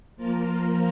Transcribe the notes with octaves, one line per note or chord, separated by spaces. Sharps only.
F3 A#3 F4 A#4